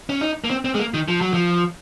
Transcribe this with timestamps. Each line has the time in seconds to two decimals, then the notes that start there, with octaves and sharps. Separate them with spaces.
0.09 C#4
0.21 D#4
0.44 A#3
0.50 C4
0.65 C4
0.75 G#3
0.79 A#3
0.94 D#3
1.08 F3
1.21 F#3
1.34 F3